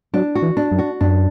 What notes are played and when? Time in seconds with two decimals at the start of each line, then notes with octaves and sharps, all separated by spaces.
0.13 F#3 D4
0.35 F#4
0.42 E3
0.57 D4
0.71 F#2
0.79 F#4
1.01 F#2 D4